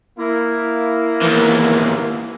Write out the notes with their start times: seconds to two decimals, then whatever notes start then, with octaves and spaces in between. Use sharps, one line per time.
0.18 A#3 E4
1.22 D#2 E3